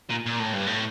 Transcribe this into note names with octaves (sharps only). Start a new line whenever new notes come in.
A#2
A#2
A2
G2
A2